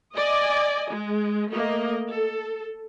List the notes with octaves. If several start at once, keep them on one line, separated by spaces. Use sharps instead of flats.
D5 D#5 G#5
G#3
A3 A#3 D#5
A4